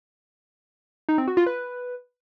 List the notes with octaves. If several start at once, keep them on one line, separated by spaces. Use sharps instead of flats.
D#4
C4
F#4
F4
B4